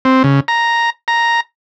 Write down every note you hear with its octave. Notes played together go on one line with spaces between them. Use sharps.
C4
C#3
A#5
A#5